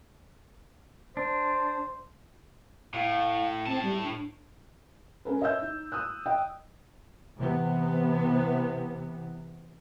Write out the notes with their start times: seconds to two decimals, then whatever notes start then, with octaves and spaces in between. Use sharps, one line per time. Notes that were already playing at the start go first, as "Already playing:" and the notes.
1.17 D4 C5
2.94 A2 F5
3.67 A2 C4 A5
3.83 G3
4.03 D4
5.25 C#4 A#4 B4
5.41 C#5 D#5 E5 E6 G6
5.62 D#4
5.92 D#6 E6 F#6
6.26 D5 D#5 G5
7.37 C3 E3 B3